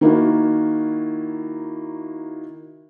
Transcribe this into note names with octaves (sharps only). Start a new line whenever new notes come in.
D#3 A#3 E4 F#4